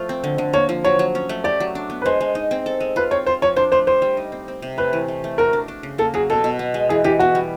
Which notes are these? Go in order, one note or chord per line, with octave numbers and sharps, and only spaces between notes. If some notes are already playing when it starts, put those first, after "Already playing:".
Already playing: F3 A3 F4
C4
D3
D3
A#3 C#5
F3
F#3 C#5
F#3
C#4
A3
G4 D5
F#3
D4
B3
B4
G#3 C5
G#3
D#4
C4
A4
G#3
F4 B4
C4 C#5
F4 C5
F3 C#5
D4 C5
A3 C5
G3 C5
G3
D#4
C4
C4
C3
A3 B4
E3
A3
A3
F#4 A#4
D4
D4
C#3
A#3 A4
F#3 G#4
B2 A4
B2
B3
G#3
E3 G#4
E3 G4
B3 F#4
G3